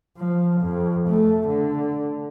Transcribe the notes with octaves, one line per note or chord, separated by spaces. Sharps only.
F3
F2
A3
D3